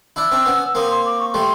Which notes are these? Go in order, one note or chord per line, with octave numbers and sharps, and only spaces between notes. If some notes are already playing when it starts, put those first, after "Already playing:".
D4 E4 E6
C4 D4
B3 C#4
E6
A#3 C4 D#6
C6
D6
C#6
C#6
G3 A3 C6